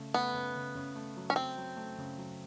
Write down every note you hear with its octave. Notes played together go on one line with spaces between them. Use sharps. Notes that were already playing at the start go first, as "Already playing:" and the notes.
Already playing: C#3 A3
A3 B3
C#3
C#3
C#3
A3
F#3
C#4
F#3 C4
F#3
A3
C#3
F#3